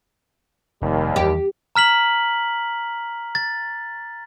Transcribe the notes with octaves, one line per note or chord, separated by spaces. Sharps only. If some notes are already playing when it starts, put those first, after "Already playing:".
F1 D#2 G3
E2 D#3 G4
A#5 F6 B6 F#7
A6